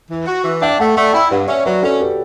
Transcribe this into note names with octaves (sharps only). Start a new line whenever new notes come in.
E3
F#4
E3
D4 E5 G5
A3 F#5 A5
A3 D5 F#5
E4 G5 B5
G2 D5 F#5
C#4 C#5 E5
F#3 B4 D5
C#4 F#4 A4
G4 B4